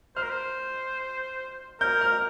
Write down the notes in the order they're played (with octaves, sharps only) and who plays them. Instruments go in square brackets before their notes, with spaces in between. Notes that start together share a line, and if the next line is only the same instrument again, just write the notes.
[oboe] C5 [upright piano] F6
[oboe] A#4
C5
[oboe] A#4 [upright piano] G6
[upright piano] F6